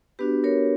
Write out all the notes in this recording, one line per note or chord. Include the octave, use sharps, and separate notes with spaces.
B3 D4 F#4 G4 B4
A#4 C#5